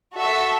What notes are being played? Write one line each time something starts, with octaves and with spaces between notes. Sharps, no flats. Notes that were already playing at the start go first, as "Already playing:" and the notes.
F#4 A4 E5